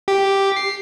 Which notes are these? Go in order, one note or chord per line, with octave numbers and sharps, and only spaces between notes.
G4
C7